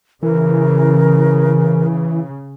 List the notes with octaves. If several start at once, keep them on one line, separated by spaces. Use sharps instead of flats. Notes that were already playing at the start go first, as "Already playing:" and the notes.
C#3 E3 A#4